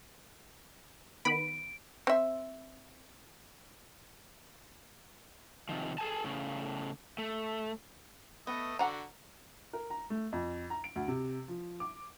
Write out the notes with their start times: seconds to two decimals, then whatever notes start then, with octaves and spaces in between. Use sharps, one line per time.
1.25 D#3 B3 B5 D7
2.07 C4 E5
5.69 C3 D#3 F3
5.98 G#4 A4 G#5 A5
6.24 A2 C#3
7.18 A3
8.47 A3 B3 D#5
8.79 D3 F#4 F#5 A#5
9.73 A#4
9.90 A#5
10.10 A3
10.33 F2
10.70 A#5
10.84 D7
10.96 D2
11.08 C3
11.48 F3
11.80 D6